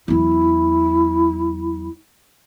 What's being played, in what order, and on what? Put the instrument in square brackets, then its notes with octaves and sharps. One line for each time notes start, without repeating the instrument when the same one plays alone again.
[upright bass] E2 F#3 [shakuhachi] E4